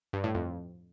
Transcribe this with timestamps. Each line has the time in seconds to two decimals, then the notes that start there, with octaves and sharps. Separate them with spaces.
0.13 G2
0.24 A2
0.35 F2